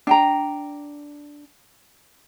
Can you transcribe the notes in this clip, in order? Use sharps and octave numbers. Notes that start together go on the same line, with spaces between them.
D4 G5 A#5